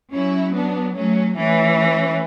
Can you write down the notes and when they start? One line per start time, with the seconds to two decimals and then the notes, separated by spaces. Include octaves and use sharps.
0.14 F#3 C#4 E4
0.55 B3 D4
0.96 F#3 A3 C#4
1.37 E3 A3 C#4